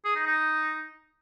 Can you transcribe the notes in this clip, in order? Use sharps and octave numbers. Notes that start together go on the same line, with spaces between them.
G#4
D#4
D#4